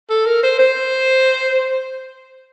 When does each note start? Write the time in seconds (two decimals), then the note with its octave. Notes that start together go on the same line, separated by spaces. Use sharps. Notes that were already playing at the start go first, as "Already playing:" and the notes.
0.10 A4
0.26 A#4
0.43 C5
0.59 C5